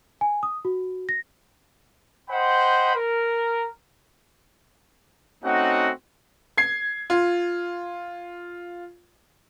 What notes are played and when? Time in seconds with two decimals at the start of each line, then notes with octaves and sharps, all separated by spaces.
0.21 G#5
0.43 D#6
0.65 F#4
1.09 A#6
2.30 C5 D#5 F#5 G5 B5
2.96 A#4
5.43 A3 C4 C#4 D#4 F#4 F#5
6.58 G#6 C7
7.10 F4